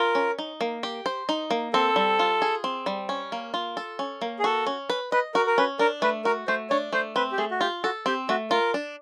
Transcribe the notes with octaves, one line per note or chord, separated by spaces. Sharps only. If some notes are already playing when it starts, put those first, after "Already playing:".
Already playing: F4 A#4
C#4
D#4
A#3
G4
C5
D#4
A#3
C4 A4
G3
F4
G#4
C4
G3
C#4
A#3
F4
A4
C#4
A#3
G#4
F#4 A4
C#4
B4
B4 D#5
F#4 A#4
A#4
C#4 B4
D4 A#4
A3 B4
F#4 A#4
A3 C5
D4 C#5
A3 C5
C4 B4
G4
A3 G#4
F#4
F4 G4
F#4 A4
C4 G4
A3 F#4
F4 A#4
D4